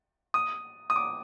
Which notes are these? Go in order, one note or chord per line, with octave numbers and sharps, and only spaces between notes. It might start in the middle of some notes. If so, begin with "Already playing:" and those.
D#6
D#6
D6